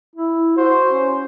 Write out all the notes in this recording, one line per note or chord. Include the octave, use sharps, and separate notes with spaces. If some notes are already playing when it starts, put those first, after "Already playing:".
E4
F#4 C5
C#4